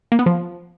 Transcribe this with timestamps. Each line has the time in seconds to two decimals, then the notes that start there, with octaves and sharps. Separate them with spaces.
0.12 A#3
0.19 B3
0.26 F3